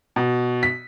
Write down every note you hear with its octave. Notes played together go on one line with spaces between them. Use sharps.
B2
B6